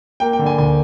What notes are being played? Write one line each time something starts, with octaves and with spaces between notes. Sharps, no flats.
A#3 G5
G5
D3
G#5
D2 G#5